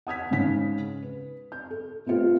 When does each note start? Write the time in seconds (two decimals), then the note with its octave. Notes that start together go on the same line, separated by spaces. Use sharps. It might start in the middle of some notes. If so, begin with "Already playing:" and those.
0.07 F#5 D#6 G#6 B6
0.31 G#2 C#3 B6
1.02 B4
1.52 G6
1.71 A4
2.06 A3 B3 C4 F4 G4